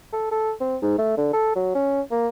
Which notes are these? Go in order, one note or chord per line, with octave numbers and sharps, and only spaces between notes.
A4
A4
C4
G#2
A3
D3
A4
F#3
C#4
A#3